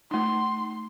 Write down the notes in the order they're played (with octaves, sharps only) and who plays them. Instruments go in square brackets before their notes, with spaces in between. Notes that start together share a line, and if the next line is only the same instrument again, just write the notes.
[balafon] A3 D#4 [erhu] C6